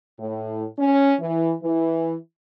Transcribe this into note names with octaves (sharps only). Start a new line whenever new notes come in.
A2
C#4
E3
E3